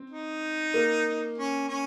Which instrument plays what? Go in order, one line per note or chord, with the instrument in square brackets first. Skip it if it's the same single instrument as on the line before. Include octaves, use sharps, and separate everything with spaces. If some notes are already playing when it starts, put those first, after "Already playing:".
Already playing: [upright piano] C4
[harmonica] D#4
[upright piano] A#3
[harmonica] C#4
C#4